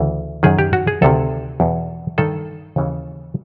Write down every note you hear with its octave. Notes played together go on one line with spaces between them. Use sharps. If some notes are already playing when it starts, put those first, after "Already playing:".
Already playing: D2 C#3 E3
F#2 D#3 G#4
G4
F#4
G#4
D2 C3 D#3 A4
E2 B2
G2 D#3 A4
D#2 C#3 E3